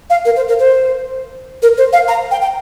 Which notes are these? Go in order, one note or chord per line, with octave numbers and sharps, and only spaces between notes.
F5
A#4
C5
A#4
C5
A#4
C5
F5
A#5
G5
G5